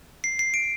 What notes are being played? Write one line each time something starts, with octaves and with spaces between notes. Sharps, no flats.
C7
C7
D7